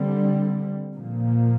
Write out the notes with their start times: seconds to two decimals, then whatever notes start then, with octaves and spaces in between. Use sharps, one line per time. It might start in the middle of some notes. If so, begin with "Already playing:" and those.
Already playing: D3 G3 C4
0.95 A#2 F3 A#3